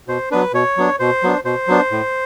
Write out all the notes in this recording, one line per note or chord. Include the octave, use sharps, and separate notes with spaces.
B2 C5
F#3 B3 D4 B4
B2 C#5
F#3 B3 D4
B2 C5
F#3 B3 D4
B2 C5
F#3 B3 D4
A2